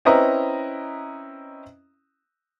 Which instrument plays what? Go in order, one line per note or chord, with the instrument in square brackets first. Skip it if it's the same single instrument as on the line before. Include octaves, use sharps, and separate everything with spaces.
[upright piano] C4 C#4 E4 B4 D#5 A#5